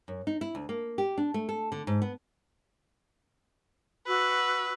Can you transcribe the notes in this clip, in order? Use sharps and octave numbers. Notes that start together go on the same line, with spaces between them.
F#2
D#4
E4
D2
A#3
G4
D4
A3
A4
D3
G#2
B3
F#4 B4 E6